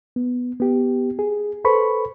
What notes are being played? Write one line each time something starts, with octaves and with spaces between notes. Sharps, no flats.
B3
B3 G4
G#4
A4 B4 C5 B5 C#6